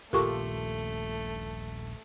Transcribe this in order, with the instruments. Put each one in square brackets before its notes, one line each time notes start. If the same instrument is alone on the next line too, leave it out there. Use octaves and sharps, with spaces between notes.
[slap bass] D#1 A#1 [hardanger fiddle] A3 [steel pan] F4 G4 A4 [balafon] A#4 C#6